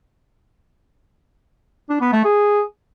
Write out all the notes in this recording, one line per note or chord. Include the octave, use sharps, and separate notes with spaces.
D4
B3
A3
G#4